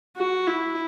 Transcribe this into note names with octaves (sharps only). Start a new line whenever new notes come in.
F#4
E4